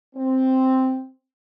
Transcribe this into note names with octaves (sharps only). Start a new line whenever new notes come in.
C4